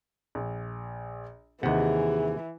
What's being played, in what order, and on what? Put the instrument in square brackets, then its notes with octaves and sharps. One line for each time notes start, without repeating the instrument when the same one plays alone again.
[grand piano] A#1
[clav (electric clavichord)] D#2 C3 [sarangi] E3 [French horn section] G#4 [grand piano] D#5 F#5